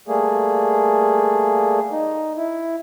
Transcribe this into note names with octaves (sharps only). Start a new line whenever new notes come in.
G3 A3 A#3 G#4
D#4
E4